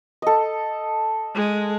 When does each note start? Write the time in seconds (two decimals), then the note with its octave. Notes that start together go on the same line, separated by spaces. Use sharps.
0.22 A4 D#5
1.35 G#3